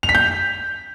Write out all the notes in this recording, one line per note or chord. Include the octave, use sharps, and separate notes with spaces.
F7
B6
G6